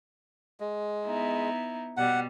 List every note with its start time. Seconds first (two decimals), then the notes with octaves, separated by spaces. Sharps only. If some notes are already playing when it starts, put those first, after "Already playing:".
0.60 G#3
1.05 B3 D#4 E4
1.97 B2 G3 F#5